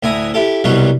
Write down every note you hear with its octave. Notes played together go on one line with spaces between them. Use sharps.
D2 A2 E4 G#5 A#5 D#6
E4 G4 A4
C2 B2 F#3 G3 F#4 D#5